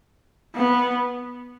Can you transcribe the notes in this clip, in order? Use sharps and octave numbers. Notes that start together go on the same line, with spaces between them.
B3